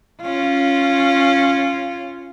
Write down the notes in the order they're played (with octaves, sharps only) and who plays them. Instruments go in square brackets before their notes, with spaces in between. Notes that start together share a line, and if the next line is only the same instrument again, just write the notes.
[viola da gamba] C#4 F4